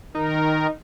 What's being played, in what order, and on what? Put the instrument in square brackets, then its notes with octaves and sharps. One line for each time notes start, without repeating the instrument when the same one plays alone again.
[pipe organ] D#3 A#4 [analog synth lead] D#4